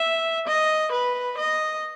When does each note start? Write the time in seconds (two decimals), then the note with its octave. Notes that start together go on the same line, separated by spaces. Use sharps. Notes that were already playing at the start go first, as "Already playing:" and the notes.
Already playing: E5
0.47 D#5
0.92 B4
1.38 D#5